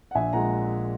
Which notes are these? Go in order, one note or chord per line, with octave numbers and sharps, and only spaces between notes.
F#5
A#1 E5 G#5
A#2 G#3 F#5 A#5